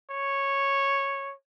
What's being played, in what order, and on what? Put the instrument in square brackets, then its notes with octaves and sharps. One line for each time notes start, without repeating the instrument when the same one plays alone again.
[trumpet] C#5